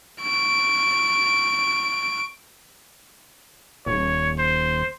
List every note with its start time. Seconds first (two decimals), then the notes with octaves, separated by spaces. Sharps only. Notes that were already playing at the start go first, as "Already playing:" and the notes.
0.22 C#6 D7
3.86 D#1 C#5
4.39 C5